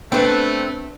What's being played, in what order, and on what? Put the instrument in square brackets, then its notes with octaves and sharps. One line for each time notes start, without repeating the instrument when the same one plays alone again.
[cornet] A3 [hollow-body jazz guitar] B3 D4 D5 [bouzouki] C4 B4